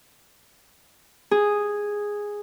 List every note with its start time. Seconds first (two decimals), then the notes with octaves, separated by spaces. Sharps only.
1.31 G#4